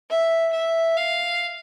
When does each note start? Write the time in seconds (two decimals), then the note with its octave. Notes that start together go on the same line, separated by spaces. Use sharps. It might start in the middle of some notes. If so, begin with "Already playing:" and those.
0.10 E5
0.53 E5
0.96 F5